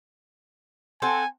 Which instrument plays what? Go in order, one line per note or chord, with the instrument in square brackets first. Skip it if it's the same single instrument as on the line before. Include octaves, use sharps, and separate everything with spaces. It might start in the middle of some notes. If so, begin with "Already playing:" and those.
[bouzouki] C4 A4 F#5 [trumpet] G#5